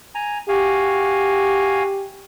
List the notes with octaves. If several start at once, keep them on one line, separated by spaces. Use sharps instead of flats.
G#5 A#5
F#4 G4 F5 G#5